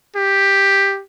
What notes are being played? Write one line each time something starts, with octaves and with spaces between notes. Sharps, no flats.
G4